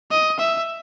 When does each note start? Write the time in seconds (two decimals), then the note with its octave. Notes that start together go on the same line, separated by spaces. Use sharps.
0.11 D#5
0.39 E5